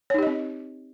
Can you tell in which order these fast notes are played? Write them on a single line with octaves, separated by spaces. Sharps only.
C#5 D#4 G4 D#5 C4